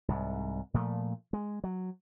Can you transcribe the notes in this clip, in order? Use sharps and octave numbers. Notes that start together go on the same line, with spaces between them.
C2 G#2
A#2 F3 A3
G#3
F#3